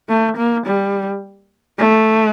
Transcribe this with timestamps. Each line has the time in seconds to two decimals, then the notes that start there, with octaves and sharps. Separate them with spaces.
0.09 A3
0.36 A#3
0.66 G3
1.78 A3